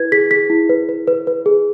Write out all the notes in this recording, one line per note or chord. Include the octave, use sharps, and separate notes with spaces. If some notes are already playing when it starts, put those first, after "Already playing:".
Already playing: E4 B4 G#6
G#4 B6
G#4 B6
E4
B4
B4
B4
B4
G#4